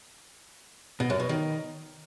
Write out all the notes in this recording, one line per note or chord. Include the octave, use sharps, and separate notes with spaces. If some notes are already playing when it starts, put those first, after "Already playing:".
B2
F#2
B2
D#3